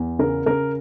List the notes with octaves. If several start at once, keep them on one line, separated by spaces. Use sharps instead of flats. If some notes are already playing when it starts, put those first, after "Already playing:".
Already playing: E2
C#3 A#4
C#3 A#4